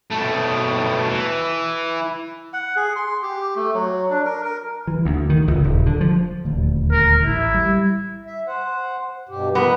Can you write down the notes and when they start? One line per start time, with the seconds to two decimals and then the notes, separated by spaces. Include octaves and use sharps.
0.11 B2 A3
1.09 E3
2.53 F#5
2.76 G#4
2.96 C6
3.22 G4
3.56 A3
3.74 F#3
4.10 D4
4.25 A#4
4.44 A#4
4.87 E3
5.05 D2
5.30 D#3
5.48 C#2
5.64 D#1
5.86 D3
6.01 F3
6.45 D#1 D2
6.92 A#4
7.24 A1 E4
7.54 G3
8.26 E5
8.47 C5 F#5
9.29 G2 B2 G4
9.55 F3 B3 A#4